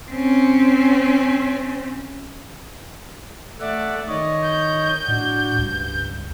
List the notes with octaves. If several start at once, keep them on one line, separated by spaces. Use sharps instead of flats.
C4 C#4
A3 D5 E5 F#5
D#3 C#5 D#5
G6
A2 D4 F#4
C#2 G2